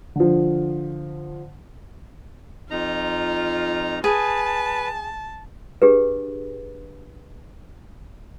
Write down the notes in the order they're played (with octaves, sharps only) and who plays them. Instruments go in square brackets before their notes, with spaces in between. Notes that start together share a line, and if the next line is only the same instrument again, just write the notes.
[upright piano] D3 F3
[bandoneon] F2 D#4 A#5 [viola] F4
[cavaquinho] G#4 [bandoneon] B4 [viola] A5
[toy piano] D4 G4 G#4 B4